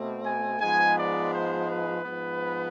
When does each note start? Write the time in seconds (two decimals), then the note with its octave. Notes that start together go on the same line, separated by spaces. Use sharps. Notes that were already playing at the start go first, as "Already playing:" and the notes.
Already playing: B2 A3 C4
0.24 G#5
0.60 G#2 F3 G#3 B3 G#5
0.96 D5
1.32 C5
1.68 B4
2.05 G#2 F3 B3